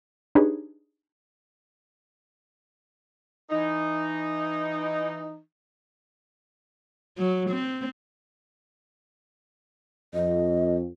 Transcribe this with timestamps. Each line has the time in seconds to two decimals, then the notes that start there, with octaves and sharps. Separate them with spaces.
0.35 D4 D#4 G4 G#4 B4 C#5
3.50 E3 D#4
7.18 F#3
7.50 C4
10.14 F2 D#5